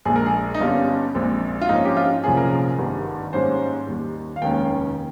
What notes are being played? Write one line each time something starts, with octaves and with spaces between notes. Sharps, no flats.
A#1 A#2 G#3 G#4
A#4
G#4
D#4
G1 G2 G3 C#4 F4
A#1 A#2 G#3 C4
F4
G#2 F3 A#3 C#4 D#4
G4
F4
C2 A#2 F3 A#3 C#4 G#4
A#4
G#4
G#1 G2 D#3 G3
G#2 G3 A#3 C#4 C5
D#2 D#3 G3
F5
F1 D#2 D#3 G#3 C#4 G5